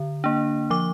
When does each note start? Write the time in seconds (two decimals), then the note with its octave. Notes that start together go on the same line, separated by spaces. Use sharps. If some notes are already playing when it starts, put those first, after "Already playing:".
Already playing: D3
0.24 A#3 D4
0.70 F3 D6